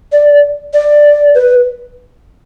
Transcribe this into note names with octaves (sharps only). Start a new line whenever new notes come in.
D5
D5
B4